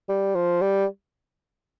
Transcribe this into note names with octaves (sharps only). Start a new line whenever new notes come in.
G3
F3
G3